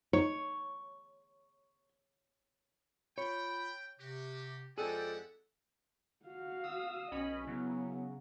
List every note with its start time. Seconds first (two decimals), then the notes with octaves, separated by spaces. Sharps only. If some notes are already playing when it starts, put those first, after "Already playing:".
0.13 D#4 C#5
3.18 F4 C#5 G5 B5
4.00 C3 F#4 G4
4.78 F2 G#3 E4 G#4 A4 D5 F#5 G5
6.26 F#4 F5
6.64 D#6 E6
7.11 B1 C#4 D#5 B5
7.47 C#3 F#3 B3 E4